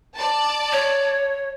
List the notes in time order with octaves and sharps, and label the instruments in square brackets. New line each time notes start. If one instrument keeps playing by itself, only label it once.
[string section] D5 A5
[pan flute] C#5